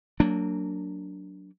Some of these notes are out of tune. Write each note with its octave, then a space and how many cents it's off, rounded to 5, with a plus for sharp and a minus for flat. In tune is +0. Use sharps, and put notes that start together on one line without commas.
F#3 +0 A#3 -30 D4 -10